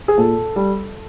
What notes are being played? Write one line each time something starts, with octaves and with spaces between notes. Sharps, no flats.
G#4
A#2 A4
G3